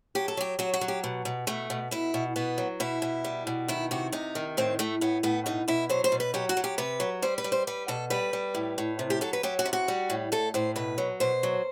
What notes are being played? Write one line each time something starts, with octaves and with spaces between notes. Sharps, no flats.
F#3 G4
A4
F#3 G4
F#3 F#4
F#4
F#3
G4
B2
B2
B2 A3
B2
B2 E4
B2
B2 B3
F#3
B2 E4
B2
G3
B2
D#3 E4
C3 F#4
C3 D#4
D#3
A2 C4
A2 A3
A2 B3
A2 B3
B2 D#4
B2 E4
F#3 C5
C5
B2
B4
F#3 G4
F#4
F#3
G4
C3 B4
F#3
G3 C5
B4
G3
C5
G3 B4
B2 A4
G3 B4
G3
A2
A2
C3
G4
F#3 A4
B4
F#3 G4
F#4
C3
F#4
G3
A2
A2 A4
A2 C5
B2 B4
F#3
B2 C5
F#3